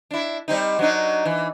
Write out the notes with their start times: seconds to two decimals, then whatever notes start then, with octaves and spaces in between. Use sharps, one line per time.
0.11 D4 E4
0.48 G3 C4 D#4
0.79 F#3 D4 D#4
1.25 E3